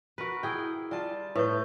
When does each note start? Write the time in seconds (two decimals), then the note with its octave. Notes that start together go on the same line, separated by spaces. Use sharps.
0.18 F#4 A#4 B4
0.43 E4 G#4 G5
0.91 G3 F4 A5
1.35 A2 B4 G6